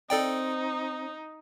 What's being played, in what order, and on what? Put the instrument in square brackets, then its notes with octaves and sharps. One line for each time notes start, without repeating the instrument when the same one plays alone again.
[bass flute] C4 [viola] D#4 [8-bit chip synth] A4 D5 G5